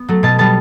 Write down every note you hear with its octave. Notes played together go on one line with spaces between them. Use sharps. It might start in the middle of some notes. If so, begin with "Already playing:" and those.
Already playing: B3
F#3 A3
B2 A5
G3 B3 A5